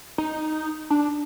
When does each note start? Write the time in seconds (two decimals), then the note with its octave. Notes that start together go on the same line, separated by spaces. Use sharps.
0.18 D#4
0.90 D4